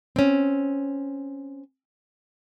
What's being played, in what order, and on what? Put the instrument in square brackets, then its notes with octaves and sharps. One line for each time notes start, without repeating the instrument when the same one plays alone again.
[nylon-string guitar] C4 C#4